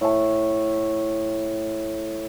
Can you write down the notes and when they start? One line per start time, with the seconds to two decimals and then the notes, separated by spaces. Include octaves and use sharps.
0.01 A2 A5